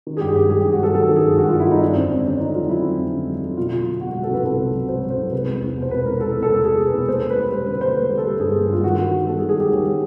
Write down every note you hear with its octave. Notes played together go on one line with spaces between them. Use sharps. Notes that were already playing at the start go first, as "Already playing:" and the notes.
D#3
G#4
G2 G4
G#4
G2 G4
F#3 G#4
G4
G2
F#4
F#3 A4
D#3 A4
D#3
G#4
G2
G2 F#4
F4
G2
E4
G2 D#4
F2 D4
D3 C4
F2 C#4
D3 D4
F2 D#4
F#3 F4
F#3 E4
F2
F2
D3
F#3
D3
B2 F4
F#3
B2
B2 F#4
F#4
F#3
A4
C2 B4
C2 A4
F#3
F#3
F#3 C5
F#3
C5
C2
G#3 B4
E2
E2
B2
C5
B2 B4
E2 A#4
G#3 A4
E2
A4
B2
B2 G#4
B2
B4
E2
A#3 C5
A#3
B4
G3
G3 C5
D3 B4
A#3 C5
A#3 B4
G3
A4
G3
G2 G#4
A#3
G2 F4
D#3 F#4
D#3
G3
B3 A4
G#4
D#3
G#4
G3 G4
D#2
G3